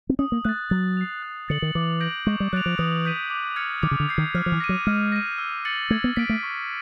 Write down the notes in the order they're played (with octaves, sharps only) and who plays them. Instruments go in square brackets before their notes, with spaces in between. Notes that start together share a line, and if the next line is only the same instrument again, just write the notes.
[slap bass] C4
[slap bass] C#4 [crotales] D#6
[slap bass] A#3
[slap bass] A3 [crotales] F#6
[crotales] A6
[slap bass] F#3 [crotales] A6
[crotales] C7 F7
F#6
[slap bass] D3 [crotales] A6 C#7 F#7
[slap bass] D#3
[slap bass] E3 [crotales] D6
[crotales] G6 A#6 D7 F#7
[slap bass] G#3 [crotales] C#6
[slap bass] G3
[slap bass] F#3 [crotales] F#6 A6 D7 F7
[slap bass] F3
[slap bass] E3 [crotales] D#6
[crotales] G6 B6 D#7
D6
F6 G#6 C#7
[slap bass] D#3 [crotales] D6
[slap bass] C#3
D3
[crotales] G6 C7
[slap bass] D#3
[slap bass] F3 [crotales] F6
[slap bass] F3
E3
[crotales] A#6 D#7
[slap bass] F#3
[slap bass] G#3 [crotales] F6
[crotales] A#6 D#7
E6
A6 C#7 F#7
[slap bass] A3 [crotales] G#6
[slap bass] B3
[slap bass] A#3 [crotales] B6 D7
[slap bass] A3
[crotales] C#6